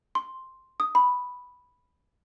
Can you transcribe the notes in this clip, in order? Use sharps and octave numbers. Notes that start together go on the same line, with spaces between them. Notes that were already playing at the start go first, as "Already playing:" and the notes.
C6
D#6
B5